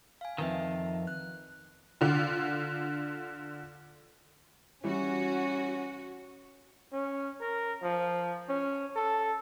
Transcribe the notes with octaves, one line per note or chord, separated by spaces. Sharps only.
F5 G#5
F2 D#3 D#4 B4 E5
F#6
D3 F4
E3 G3 C#4 F#4
C#4
A#4
F3
C#4
A4